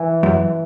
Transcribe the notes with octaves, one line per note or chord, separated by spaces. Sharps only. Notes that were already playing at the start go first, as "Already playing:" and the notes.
Already playing: E3
F#2